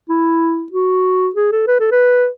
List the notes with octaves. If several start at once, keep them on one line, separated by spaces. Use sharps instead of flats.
E4
F#4
G#4
A4
B4
A4
B4